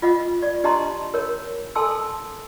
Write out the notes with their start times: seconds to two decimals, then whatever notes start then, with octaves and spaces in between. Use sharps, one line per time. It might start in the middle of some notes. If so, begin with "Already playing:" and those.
0.02 F4 D#5 F#5
0.42 D5
0.64 D4 G4 D#5 A5 A#5 C6
1.14 A#4 C#5
1.75 A4 G#5 A5 C6 E6